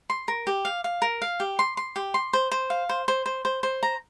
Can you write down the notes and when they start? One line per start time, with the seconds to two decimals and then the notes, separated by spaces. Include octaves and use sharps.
0.10 C6
0.28 A#4
0.47 G4
0.65 F5
0.84 F5
1.02 A#4
1.22 F5
1.40 G4
1.59 C6
1.77 C6
1.96 G4
2.14 C6
2.33 C5
2.51 C5
2.70 F5
2.89 C5
3.08 C5
3.26 C5
3.45 C5
3.63 C5
3.83 A#5